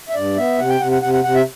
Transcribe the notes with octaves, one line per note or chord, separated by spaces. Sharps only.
E5
G2 D5
B3 E5
C3 F#5
G5
C3 F#5
F#5
C3 F#5
F#5
C3 F#5
E5